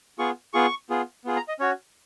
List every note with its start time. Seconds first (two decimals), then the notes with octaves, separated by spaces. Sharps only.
0.19 B3 F4 G#4 C#6
0.53 B3 F4 G#4 C#6
0.90 B3 F4 G#4
1.25 B3 F4 G#4
1.36 A#5
1.48 D#5
1.60 C#4 F#4 C#5